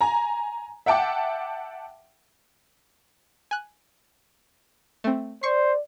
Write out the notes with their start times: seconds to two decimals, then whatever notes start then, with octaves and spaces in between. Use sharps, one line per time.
0.01 G#5 A#5
0.86 E5 F#5 G5 A5 D6
3.51 G#5 F#6
5.04 A3 C4
5.43 C5 D5 C#6 C7